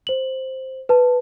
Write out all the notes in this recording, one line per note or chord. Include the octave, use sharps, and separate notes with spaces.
C5 F#7
B4 A5